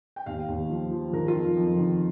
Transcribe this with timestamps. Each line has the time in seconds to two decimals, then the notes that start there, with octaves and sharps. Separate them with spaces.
0.16 G5
0.26 D#2 F5
0.48 D#2
0.70 F3
0.91 F3
1.13 D#3 A#4
1.28 F4
1.35 F2
1.57 F2
1.78 D#3